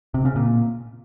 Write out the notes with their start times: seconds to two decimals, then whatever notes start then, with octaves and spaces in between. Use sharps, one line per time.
0.14 C3
0.25 C#3
0.36 A#2